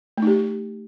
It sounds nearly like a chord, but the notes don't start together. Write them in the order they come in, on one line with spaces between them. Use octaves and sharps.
A3 D#4 G4